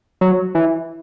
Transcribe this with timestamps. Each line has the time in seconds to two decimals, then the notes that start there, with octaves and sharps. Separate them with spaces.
0.21 F#3
0.55 E3